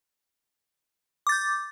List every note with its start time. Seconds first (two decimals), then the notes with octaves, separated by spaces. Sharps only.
1.27 D6
1.29 A6
1.32 G6